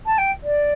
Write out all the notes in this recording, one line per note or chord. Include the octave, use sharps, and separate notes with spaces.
A5
G5
D5